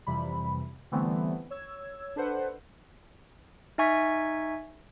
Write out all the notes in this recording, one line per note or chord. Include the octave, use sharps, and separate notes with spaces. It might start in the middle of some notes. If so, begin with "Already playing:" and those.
F2 C3 E3 G3 B5
D3 E3 G3 A3 B3 C4
C#5 E6 G#6
D4 A4 B4 C5 F#5
D#4 E5 G#5 C#6 G#6 B6